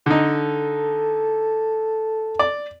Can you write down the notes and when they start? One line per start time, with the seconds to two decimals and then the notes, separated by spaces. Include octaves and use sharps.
0.06 D3 D#4 A4
2.39 D5